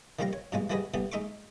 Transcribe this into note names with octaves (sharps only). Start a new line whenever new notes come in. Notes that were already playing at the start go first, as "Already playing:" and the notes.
D#3 F3 G3 C4 F5 A#5
C#5
G2 B2 E3 F3 G#3
E3 G3 F#4 G#4 B4 D#5
D3 E3 G3 B3
G#3 D#4 E5 C#6 D6